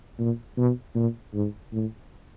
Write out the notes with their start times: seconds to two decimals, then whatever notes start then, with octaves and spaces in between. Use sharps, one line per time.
0.19 A#2
0.58 B2
0.95 A#2
1.34 G#2
1.73 A2